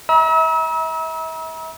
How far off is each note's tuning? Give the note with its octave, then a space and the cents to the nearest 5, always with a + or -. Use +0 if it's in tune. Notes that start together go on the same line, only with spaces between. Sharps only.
E5 -35 A#5 +45 E6 -40